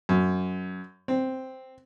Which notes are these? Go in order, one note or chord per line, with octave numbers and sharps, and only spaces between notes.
F#2
C4